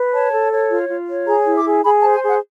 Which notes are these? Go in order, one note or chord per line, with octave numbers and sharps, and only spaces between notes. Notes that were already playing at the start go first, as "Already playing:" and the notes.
Already playing: B4
C#5 A5
A4
C#5
F4
F4
C#5
G#4 A#5
E4
D6
G#4
G#4 B5
A5
C5
G#5
G#4 F#5